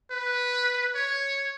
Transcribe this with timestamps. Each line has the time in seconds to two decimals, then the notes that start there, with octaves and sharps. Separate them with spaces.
0.11 B4
0.95 C#5